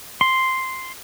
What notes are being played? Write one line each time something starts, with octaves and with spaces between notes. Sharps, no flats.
C6